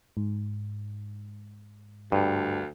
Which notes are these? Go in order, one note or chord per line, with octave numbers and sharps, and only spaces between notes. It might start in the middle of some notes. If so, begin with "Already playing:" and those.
G#2
D2 G2